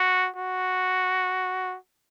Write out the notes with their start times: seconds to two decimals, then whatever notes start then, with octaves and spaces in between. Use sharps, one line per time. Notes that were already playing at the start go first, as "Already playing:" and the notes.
Already playing: F#4
0.36 F#4